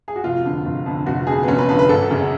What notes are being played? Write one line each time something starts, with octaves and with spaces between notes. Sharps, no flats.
G#4
F#4
F1 F4
F2 D3
F1
F2 D3
F1 F#4
F2 D3 G#4
B3
F1 C#4
B4
F2 D3 B4
B4
G#1 A4
F#2 C#3